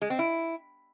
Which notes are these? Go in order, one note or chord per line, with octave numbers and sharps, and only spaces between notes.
G#3
C4
E4